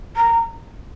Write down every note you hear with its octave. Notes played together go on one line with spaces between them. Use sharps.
A#5